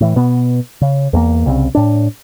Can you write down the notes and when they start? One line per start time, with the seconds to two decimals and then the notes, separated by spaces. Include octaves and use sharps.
0.01 A2 E3
0.16 B2 B3
0.81 C#3
1.13 E2 A3 A#3
1.46 C2 C#3 C4
1.75 A2 D4